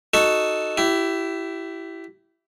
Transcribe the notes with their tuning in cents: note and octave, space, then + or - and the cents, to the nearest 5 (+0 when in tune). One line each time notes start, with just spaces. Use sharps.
D#4 +0 F#4 +0 A4 +0
E4 +10 G4 -25